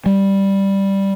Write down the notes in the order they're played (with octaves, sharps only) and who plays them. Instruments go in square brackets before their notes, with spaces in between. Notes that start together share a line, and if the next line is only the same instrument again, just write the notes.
[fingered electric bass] G3